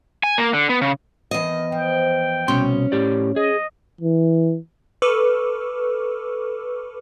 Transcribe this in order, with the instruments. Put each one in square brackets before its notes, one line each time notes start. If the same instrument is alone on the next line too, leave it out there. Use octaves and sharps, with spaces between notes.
[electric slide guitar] G#5
A#3
D3
B3
C#3
[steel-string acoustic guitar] E2 D#5 [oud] D#3 C4
[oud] F3 [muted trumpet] G5
[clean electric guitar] C2 B2 C6 [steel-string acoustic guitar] C#4
[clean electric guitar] A2 G4 D5
[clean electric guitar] G#4 [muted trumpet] D#5
[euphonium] E3
[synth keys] A4 B4 C#6 D6 E6 F6